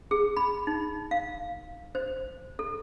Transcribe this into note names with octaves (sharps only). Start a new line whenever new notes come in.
G#4
B5
D#4
F5
C5
A4